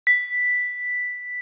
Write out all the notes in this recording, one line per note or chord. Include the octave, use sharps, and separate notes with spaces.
B6